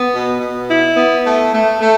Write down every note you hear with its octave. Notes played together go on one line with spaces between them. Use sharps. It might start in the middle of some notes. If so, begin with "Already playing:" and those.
Already playing: B3
B2
B2
E4
B3
A3
A3
A3